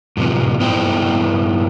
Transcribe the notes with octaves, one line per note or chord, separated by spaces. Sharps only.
F#2 A2 C3 F3
G2 B3 E4 C5 G5